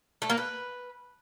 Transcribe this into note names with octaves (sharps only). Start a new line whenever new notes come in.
A3
A#3
B4